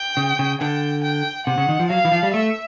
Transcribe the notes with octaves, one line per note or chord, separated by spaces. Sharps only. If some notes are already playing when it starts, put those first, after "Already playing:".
Already playing: G5
C#3
C#3
D3 G5
G5
C3 F#5
C#3
D#3
F3
F#3 F5
E3
F3
G3
A3 E5